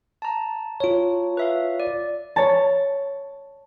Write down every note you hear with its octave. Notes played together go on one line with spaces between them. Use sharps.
A5 A#5
F4 C#5
B4 E5 F5
D5
C#5 A5